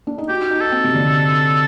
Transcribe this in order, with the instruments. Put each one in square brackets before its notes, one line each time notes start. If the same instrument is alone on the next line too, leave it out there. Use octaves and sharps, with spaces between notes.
[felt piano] D4
D#4
[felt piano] F#4 [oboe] G4
[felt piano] D#4
[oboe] A4
[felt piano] C4
C3
D3